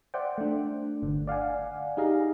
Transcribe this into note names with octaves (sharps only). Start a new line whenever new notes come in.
C5 D5 E5 F#5 G5
A3 D4
G1 D3
D5 F5 F#5 G#5
D#4 G4 G#4 F5 A#5